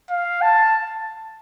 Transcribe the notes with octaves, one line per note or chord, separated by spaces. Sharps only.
F5
A5